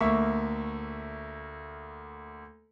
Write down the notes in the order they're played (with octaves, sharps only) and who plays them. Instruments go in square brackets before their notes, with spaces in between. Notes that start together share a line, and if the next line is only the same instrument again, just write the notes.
[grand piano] D2 A#3 E5 C#6